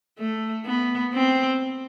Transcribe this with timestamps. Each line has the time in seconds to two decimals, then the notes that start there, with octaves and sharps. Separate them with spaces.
0.19 A3
0.65 B3
1.13 C4